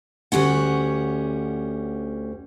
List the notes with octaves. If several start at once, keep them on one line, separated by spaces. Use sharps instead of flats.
D2 G3 C#4 F#5